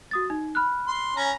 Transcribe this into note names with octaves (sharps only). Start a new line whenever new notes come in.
F#4 D#6 A6
D#4
B5 F6 F#6
C6
C#4 A#5